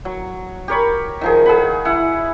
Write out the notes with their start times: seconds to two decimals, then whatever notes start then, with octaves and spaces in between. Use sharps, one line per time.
0.05 F#3
0.68 G4 A#4 C#5 B5
1.21 D#3 F3 G#4
1.46 G#4 F#5 B5
1.85 E4 F#5